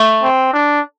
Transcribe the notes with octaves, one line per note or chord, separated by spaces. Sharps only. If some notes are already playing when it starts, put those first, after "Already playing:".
Already playing: A3
C4
D4